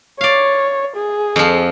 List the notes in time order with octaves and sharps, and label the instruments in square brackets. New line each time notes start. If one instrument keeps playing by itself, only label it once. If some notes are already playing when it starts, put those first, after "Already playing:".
[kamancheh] C#5 [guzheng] D5 F5
[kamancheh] G#4
[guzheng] F2 F3